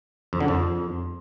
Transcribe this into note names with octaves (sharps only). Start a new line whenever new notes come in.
F2
D3
F2